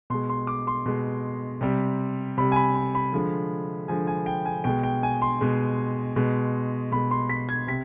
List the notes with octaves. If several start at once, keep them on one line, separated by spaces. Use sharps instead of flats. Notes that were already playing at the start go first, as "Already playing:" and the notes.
B2 G#3 C6
C6
D6
C6
B2 G#3
C3 G3
C3 G3 B5
G#5
B5
B5
B5
D3 F3 G#3
D3 F3 G#3 G#5
G#5
G5
G#5
B2 G#3 G5
G5
G#5
C6
B2 G#3
B2 G#3
B2 G#3 B5
C6
B6
G#6
C3 B6